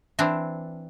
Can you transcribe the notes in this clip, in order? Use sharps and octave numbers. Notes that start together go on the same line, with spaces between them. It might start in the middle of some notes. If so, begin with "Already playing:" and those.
E3 C4 D4 E4